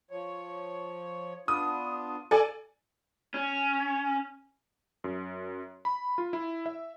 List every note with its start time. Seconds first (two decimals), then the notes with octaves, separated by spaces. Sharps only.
0.11 F3 C#5
1.48 B3 D4 F4 D#6
2.31 A4 D5 G#5
3.34 C#4
5.04 F#2
5.85 B5
6.18 F4
6.33 E4
6.66 E5